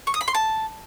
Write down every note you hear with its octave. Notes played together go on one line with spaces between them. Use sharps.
C#6
D#6
B5
C6
A5